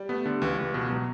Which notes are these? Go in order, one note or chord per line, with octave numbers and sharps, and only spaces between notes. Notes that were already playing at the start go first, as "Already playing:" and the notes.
Already playing: G3
A3 B3
D3 G3
C#2 E3
C#2
B2
B2 F#3